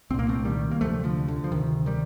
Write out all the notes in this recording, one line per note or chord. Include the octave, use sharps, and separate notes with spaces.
C2 A#2 A#3 C4
A3 C4
D#3 G3
A#3
D2 C3 F3 A3
D3 F3
D3
F3
D2 C3 D#3
D#3 G3